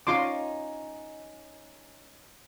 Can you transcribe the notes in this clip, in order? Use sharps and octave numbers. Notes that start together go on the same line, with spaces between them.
C#4 D#4 F4 C6 D6